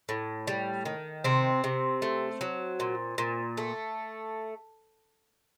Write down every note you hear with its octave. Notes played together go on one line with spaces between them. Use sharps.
A2
G3
D#3
C3 C4
C3
A3
F#3
A#2
A#2
A3